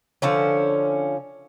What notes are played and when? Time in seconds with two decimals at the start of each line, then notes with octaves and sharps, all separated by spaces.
0.22 D3 F3 C#4